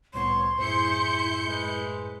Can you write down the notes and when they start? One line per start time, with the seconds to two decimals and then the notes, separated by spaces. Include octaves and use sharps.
0.14 C2 A2 B3 C#5 C6
0.59 F#2 A2 E4 G#4 C5 G6 C#7
1.45 G#3 B4